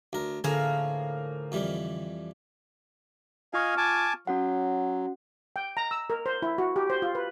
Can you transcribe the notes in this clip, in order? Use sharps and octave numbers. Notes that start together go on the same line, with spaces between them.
D2 A#4
A2 D3 F3 A#3 G#4 G#5
F2 E3 G3
F4 D#5 F5 G#5 C#6 F6
G#5 A5 D6
F#3 C#4 F#4 F#5
G5
A#5
E6
A#4
C5
E4
F#4
G4
C5
F4
B4